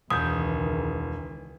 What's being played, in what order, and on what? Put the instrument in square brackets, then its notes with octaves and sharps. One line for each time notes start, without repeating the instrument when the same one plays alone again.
[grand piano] E1 [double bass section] C#2 D#3 E3 [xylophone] D#6 G6